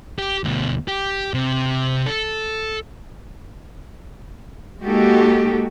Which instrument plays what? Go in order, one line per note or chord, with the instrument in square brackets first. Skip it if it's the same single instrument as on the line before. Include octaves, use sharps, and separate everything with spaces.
[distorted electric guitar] G4
D2 B2
G4
C3
A4
[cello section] G#3 A#3 D#4 F#4 G4 A4